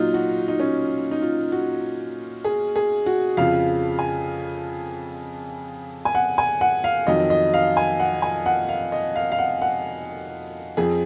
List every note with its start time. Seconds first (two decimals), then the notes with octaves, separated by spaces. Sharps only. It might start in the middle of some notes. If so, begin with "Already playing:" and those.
Already playing: A#2 F#3 D#4 F4
0.14 F#4
0.48 D#4
0.60 C#4
1.11 D#4
1.22 F4
1.52 F#4
2.44 G#4
2.76 G#4
3.06 F#4
3.37 F2 C#3 F3 F5
3.99 G#5
6.05 G#5
6.15 F#5
6.38 G#5
6.61 F#5
6.84 F5
7.07 F2 D#3 F#3 D#5
7.30 D#5
7.54 F5
7.77 G#5
8.00 F#5
8.22 G#5
8.46 F#5
8.69 F5
8.92 D#5
9.16 F5
9.32 F5
9.39 F#5
9.62 F#5
10.77 F2 F3 G#4